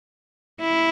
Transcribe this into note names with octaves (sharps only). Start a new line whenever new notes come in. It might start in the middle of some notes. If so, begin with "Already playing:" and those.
E4